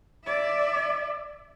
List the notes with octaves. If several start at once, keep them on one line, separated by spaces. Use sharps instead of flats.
D5 E5